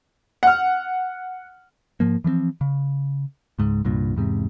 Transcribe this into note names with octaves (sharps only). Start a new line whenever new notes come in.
F#5 F6
G#2 F3 A#3
E3 F3 A3 C4
C#3
C#2 G#2
C2 G2 A#2
E2 G#2 C3